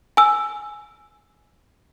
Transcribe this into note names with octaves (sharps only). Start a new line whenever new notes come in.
G#5 E6